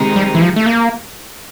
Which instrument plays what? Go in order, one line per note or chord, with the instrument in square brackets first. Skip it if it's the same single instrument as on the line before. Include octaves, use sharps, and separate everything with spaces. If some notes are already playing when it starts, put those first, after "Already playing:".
Already playing: [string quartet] C3 D#3 G#3 C4 D#4
[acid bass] G3
E3
F3
A3
A#3